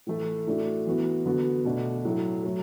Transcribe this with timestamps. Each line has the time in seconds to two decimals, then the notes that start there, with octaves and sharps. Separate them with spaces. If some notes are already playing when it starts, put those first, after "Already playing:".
0.07 A2 E3 A3 E4
0.47 A2 A3 D4 F#4
0.86 E3 B3 F#4
1.26 D3 B3 F#4
1.65 B2 A3 D4
2.05 A2 F#3 A3
2.43 F#3 A3